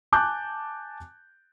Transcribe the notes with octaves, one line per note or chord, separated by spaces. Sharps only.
G#5 A5 D6 F#6 G6